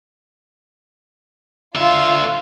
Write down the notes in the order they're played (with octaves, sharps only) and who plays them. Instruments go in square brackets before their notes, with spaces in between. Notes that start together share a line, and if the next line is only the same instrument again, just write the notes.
[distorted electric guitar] D3 E5 [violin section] F4